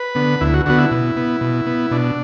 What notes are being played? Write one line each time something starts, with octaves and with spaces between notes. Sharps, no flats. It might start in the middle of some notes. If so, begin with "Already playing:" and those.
Already playing: B4
D3 B3
D2 E4
F#4
D3 B3 F#4
E4
B2
B3
B2
B3
B2 D4